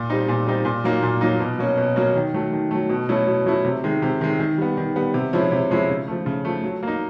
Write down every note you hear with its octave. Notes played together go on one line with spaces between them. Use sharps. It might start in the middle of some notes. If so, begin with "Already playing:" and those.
Already playing: A#2
G3 C4 D#4
A#2
G3 C4 D#4
A#2
F#3 A#3 D#4
A#2
F#3 A#3 D#4
B2
F#3 A#3 C#4
B2
F#3 A#3 C#4
D#3
F#3 A3
D#3
F#3 A3
B2
F#3 A3 C#4 E4
B2
F#3 A3 C#4 E4
C3
D#3 G#3
C3
D#3 G#3
D#3
G3 B3
D#3
G3 B3
C3
F3 G#3 C#4 E4
C3
F3 G#3 C#4 E4
C#3
F3 A3
C#3
F3 A3
F#3
A#3 D#4